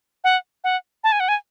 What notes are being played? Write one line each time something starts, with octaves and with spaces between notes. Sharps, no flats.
F#5
F#5
A5
G#5
F#5
G#5